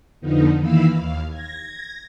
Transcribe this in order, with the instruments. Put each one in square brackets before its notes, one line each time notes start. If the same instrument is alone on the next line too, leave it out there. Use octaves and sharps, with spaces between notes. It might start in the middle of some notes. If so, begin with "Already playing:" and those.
[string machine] F2 D3 F3 B3 D#4
D#3 E3 A#3 F5 B5 E6
D#2 F5
G#6 A#6